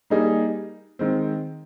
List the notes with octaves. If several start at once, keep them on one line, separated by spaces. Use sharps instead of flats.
G3 A#3 D#4 G#4
D#3 G#3 C4